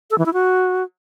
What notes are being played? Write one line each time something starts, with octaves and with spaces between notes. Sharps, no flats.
A4
E3
E4
F#4